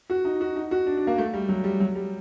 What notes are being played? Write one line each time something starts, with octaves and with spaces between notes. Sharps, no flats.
F#4
D#4
F#4
D#4
F#4
D4
D4
A#3
A3
G3
F#3
G3
F#3
G3